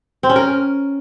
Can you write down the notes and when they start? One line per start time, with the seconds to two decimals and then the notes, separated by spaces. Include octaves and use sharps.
0.23 C4
0.30 C#4
0.36 A#4